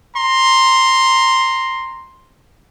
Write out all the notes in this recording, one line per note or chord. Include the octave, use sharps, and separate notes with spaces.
A#5 C6